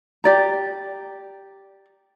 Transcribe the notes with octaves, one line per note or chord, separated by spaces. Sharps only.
G4 D5 A#5